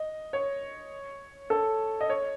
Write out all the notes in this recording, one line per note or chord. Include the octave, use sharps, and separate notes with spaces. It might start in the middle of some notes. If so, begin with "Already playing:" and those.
Already playing: D#5
C#5
A4
D#5
C#5